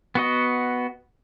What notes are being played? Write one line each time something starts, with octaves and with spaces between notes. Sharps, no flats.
B3 F#4 D#5